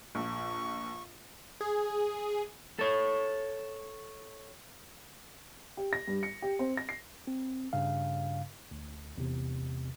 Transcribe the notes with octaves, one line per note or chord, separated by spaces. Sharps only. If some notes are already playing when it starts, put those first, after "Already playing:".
A#1 C#6
G#4
A4 C#5
G4
A#6
G2
C#7
G4
C4
A#6
C7
C4
G2 C#3 F5
D2
A1 E2 C3